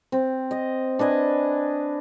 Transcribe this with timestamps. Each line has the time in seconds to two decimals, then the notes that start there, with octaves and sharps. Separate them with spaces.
0.12 C4
0.51 D#5
0.99 D4 B4 D#5 G#5